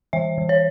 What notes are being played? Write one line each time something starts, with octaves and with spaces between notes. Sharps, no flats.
E3 E5
E3
C#5